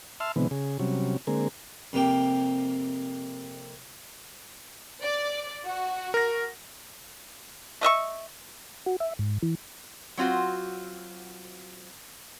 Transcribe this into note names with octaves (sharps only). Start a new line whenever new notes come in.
E5 A5 C6 E6 F6
B2 D3 E3 G#3 B3 C4
C#3 G#4
C3 F#3 G3 C#4
D3 G#3 A#3 C4 G#4 A#4
F2 C3 A#3 G4 G5
D5
F#4
A#4 A#6
A3 D#5 E5 C#6
F#4
E5
G#2
E3
F#3 C4 F4 F#4